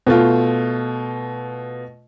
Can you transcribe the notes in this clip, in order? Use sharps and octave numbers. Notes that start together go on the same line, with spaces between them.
B2 A3 F4